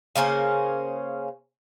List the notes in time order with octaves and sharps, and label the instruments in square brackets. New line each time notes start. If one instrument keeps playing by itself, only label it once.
[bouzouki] C#3 A#3 C#4 C5